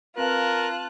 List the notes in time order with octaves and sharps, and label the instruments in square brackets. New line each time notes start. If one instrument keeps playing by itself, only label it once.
[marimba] C4 B4 F5 [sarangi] F4 [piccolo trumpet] A#4 [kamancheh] A5 F#6